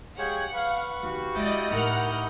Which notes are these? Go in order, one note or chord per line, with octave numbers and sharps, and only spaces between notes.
G#3 G4 G#4 C#5 F5 F#5
B4 F5 C#6
D#2 F#4 G4 F5
G#3 E4 D5 D#5 D#6 G6
A2 G3 D#4 A#4 F#5 C#6 F6